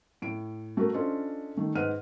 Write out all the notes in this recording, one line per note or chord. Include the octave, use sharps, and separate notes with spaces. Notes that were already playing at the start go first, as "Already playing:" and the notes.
A2 D7
A3 F#4 A#4
C#4 D4 F4 A4 C5 D#5
D#3 A3
G#2 B4 D#5 F#5 F6 D#7